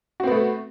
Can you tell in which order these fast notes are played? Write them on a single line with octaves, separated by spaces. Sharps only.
F#4 C4 B3 A3